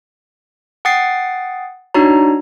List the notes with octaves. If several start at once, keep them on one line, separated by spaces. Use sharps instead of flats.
F#5 G5 D#6 A6 C7
D4 D#4 F#4 C#5 A#5